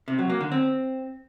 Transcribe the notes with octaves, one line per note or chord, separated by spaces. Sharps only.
C3
F#3
A#3
D3
C4